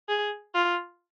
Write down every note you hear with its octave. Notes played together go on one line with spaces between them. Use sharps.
G#4
F4